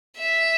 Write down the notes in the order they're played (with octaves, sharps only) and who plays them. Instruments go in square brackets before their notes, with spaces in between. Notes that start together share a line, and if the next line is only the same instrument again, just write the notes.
[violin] E5